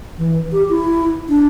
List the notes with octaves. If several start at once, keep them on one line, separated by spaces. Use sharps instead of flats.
E3
G4
E4
D4